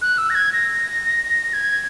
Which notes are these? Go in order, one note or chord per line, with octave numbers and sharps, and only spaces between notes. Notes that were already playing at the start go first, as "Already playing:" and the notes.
F#6
E6
A#6
G#6
A#6
G#6